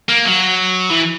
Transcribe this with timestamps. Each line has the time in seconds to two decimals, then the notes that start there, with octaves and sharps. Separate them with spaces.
0.09 A#3
0.26 F#3
0.91 E3